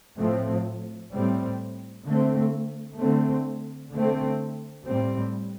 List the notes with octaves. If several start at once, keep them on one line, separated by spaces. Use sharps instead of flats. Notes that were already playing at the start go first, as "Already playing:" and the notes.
A2 F3 A3 C4
A2 G3 C4
D3 A3 C4
D3 A3 C4
D3 A3 C4
A2 G3 C4